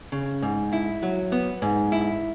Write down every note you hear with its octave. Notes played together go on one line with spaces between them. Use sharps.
C#3
G#2
E4
F#3
B3
G#2
E4